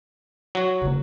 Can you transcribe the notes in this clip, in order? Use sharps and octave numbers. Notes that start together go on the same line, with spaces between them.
F#3 F#4
C#3 A#3